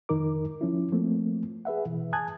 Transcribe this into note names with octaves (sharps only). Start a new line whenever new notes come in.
F2 D#3 D#4 A#4 D6
F3 C#4 E4
F3 A3 A#3 C4
G#4 B4 E5 F#5
B2 E3
G#5 A5 D#6 F#6 G#6